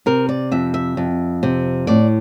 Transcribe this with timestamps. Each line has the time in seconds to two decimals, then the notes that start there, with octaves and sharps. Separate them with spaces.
0.06 C3 A#4
0.29 D5
0.51 F2 E5
0.74 E5
0.97 F2
1.43 C3
1.87 A2 D5